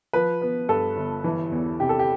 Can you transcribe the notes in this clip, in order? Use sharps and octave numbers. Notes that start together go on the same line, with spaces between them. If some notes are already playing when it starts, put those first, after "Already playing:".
F3 B4
B3
G2 A4
G1
E3
E2
C3 G4
A4
G4